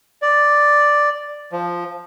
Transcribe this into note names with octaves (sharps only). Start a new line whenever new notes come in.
D5
F3